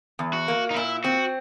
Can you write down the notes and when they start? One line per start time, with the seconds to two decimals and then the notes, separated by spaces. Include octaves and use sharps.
0.19 E2
0.33 F#4
0.48 A#3
0.71 D#4
0.75 A#2 E4
1.04 C4 F#4